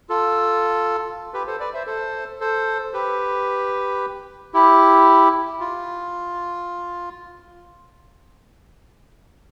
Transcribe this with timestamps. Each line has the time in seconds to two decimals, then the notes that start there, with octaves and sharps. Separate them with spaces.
0.09 F4 A4
1.34 G4 B4
1.47 A4 C5
1.60 B4 D5
1.74 C5 E5
1.87 A4 C5
2.40 A4 C5
2.94 G4 B4
4.54 E4 G4
5.60 F4